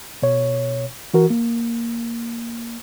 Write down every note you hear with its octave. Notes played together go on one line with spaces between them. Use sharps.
B2 C#5
E3 F#4 A#4
A#3